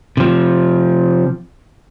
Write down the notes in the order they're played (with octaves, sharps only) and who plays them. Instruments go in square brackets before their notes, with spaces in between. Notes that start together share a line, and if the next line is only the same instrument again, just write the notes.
[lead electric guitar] C3 F3